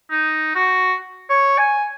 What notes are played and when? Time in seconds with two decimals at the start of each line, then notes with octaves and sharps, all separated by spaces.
0.11 D#4
0.55 F#4
1.30 C#5
1.58 G#5